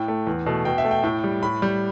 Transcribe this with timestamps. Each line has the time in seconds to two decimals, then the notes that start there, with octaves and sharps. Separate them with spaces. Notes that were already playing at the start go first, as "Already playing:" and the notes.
Already playing: A2 G5
0.08 A3
0.27 E2
0.46 B2 A3
0.65 B2 G5
0.78 E5
0.84 A3
0.91 G5
1.03 A2 G5
1.24 G3
1.43 A2 B5
1.62 G3